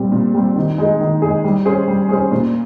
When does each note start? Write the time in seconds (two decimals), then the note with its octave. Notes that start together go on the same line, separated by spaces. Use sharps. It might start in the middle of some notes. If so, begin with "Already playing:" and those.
Already playing: A#2 G3 C4
0.12 A#2
0.34 G3 C4
0.56 D#3
0.78 G#3 D#4 G#4
1.01 D#3
1.22 G#3 D#4 G#4
1.44 G3
1.65 C#4 G#4 C5
1.88 G3
2.09 C#4 G#4 C5
2.31 A#2